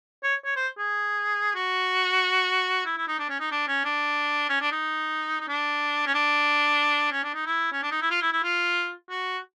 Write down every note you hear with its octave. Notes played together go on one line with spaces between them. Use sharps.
C#5
C#5
C5
G#4
F#4
E4
E4
D#4
D4
C#4
D#4
D4
C#4
D4
C#4
D4
D#4
D#4
D4
C#4
D4
C#4
D4
D#4
E4
C#4
D4
D#4
E4
F4
E4
E4
F4
F#4